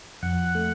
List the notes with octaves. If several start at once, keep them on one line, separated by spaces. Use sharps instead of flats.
F2 F#5
A3